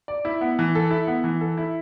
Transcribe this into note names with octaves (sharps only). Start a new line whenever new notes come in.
D5
E4
B3
E3
A4
E4
B3
E3
A4
E4